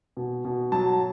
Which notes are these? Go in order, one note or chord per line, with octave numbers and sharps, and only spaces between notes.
B2
B2
F#3 A5